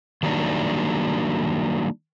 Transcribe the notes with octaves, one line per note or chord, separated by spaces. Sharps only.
D#3 F#3 G3 A#3 D4 D#4